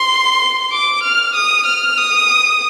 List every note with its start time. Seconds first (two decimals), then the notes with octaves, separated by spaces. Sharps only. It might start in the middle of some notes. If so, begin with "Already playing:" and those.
Already playing: C6
0.72 D6
1.03 F6
1.35 D#6
1.66 F6
1.98 D#6